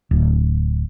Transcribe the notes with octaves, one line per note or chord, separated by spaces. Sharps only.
D1